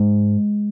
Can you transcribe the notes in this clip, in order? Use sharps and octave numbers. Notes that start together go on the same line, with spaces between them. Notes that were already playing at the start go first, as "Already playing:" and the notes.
Already playing: G#2 G#3